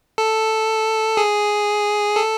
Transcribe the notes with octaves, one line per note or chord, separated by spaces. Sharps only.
A4
G#4
A4